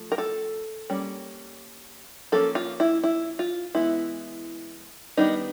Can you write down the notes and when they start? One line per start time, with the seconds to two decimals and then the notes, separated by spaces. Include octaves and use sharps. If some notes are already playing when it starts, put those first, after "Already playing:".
Already playing: F3 A3
0.12 A#4
0.18 A4
0.90 G3 A#3 C#4
2.32 F3 A#3 C#4 A4
2.55 F4
2.80 E4
3.04 E4
3.39 F4
3.75 E3 G#3 B3 E4
5.17 D#3 G3 B3 D4 D#4